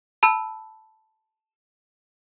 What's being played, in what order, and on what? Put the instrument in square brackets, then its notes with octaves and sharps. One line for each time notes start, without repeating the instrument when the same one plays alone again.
[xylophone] A5 B5 E6